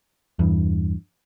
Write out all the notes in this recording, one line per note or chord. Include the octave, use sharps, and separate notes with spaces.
E2 G2